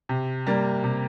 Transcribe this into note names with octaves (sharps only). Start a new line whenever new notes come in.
C3
G3 A#3
C3